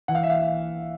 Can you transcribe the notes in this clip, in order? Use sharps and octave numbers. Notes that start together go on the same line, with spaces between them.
E3 F#5
F5
E5
F5